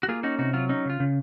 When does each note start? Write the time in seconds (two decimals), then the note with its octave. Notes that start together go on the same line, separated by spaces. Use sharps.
0.03 F#4
0.08 A#3 F4 G#4
0.23 C#4 D#4 F#4
0.39 C3 D#4 F#4
0.53 F#3 F4
0.69 C#4 D#4
0.85 C#3 F4
1.00 C#3